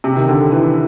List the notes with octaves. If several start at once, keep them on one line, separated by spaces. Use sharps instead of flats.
C3
D#3
D3
E3